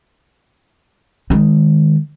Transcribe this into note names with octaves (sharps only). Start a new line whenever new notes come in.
D#3 G#3